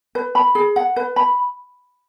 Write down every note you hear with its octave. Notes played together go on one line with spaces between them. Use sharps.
B4
B5
G#4
F#5
B4
B5